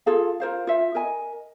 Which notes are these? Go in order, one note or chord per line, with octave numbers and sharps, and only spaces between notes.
F4 G#4 A4 F5
F4 A#4 C5 F5
F4 E5
A#4 D#5 G#5